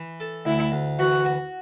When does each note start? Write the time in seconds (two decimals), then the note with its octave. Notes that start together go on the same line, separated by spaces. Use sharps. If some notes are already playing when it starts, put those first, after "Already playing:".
Already playing: E3
0.20 A4
0.45 D2 E4
0.72 D2
0.99 E3 F#4
1.25 F#4